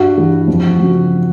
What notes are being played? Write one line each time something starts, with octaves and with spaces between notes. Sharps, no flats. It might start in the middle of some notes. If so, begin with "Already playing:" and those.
Already playing: G2 F#4
E3 G3
F2
C#3 F#3